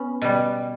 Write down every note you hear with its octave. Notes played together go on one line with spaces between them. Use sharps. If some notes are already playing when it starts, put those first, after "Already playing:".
Already playing: B3 C#4
B2 G3